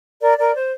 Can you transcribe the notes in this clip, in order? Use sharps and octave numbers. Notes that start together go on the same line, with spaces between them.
A#4 D5
A#4 D5
C5